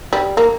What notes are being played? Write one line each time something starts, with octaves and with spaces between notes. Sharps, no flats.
G3
A#3